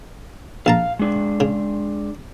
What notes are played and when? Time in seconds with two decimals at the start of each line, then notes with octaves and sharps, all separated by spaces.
0.66 A#1 F5 A5 A#5
0.99 G#3 D4
1.40 C#3